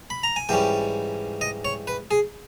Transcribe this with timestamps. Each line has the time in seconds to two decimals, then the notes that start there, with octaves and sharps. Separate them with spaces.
0.10 B5
0.23 A#5
0.36 G#5
0.49 G#2 E3 G3 C#4 G5
1.41 D#5
1.65 C#5
1.87 B4
2.11 G#4